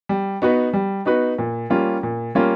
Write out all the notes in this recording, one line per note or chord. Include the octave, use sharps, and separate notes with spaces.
G3
B3 D#4 F#4 B4
G3
B3 D#4 F#4 B4
A#2
G3 A#3 C#4 F4
A#2
G3 A#3 C#4 F4